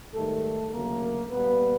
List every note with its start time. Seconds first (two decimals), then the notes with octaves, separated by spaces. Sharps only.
0.14 G#2 D#3 G3 A3 A4
0.71 D2 C#3 F#3 A3 A#3 A#4
1.30 A#2 G3 A#3 B3 B4